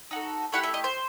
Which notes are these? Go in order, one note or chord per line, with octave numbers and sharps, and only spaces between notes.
D#4 F#4 A4
A3 E4 G4 F#5
E5
D#5
C5